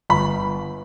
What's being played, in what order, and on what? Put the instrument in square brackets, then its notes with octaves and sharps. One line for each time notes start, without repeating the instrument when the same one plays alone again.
[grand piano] G1 B5